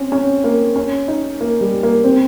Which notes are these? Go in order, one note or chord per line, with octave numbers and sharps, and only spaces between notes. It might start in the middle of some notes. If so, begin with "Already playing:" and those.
Already playing: C4 C#4
C#4
A#3
C#4
D#4
A#3
G3
A#3
C4